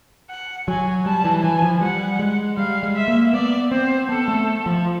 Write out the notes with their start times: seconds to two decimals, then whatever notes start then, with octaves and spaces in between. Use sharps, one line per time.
0.30 F#5
0.68 F#3 G#5
1.05 G3 A5
1.25 E3
1.43 E3 G#5
1.62 F3
1.81 G3 F#5
2.19 G#3
2.57 G3 F5
2.83 G#3
2.95 E5
3.08 A#3
3.33 B3 D5
3.71 C4 C5
4.09 B3 A4
4.28 A3
4.66 F3